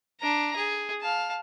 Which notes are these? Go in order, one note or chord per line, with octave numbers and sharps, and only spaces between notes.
D4 A#5
G#4
F5 A5